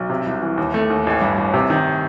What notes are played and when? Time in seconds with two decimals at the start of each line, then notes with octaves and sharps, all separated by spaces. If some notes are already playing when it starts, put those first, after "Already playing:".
Already playing: B1
0.10 C3
0.27 C2
0.42 E3
0.57 D#2
0.74 A3
0.90 D#2
1.07 A1
1.22 G2
1.38 A1
1.54 C3
1.70 D#3